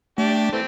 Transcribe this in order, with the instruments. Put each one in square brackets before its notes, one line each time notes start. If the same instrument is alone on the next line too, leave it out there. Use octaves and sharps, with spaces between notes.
[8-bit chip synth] A3 [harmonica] D4 G4
[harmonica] E3 A3 C4